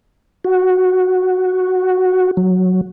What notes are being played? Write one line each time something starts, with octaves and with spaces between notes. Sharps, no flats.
F#4
F#3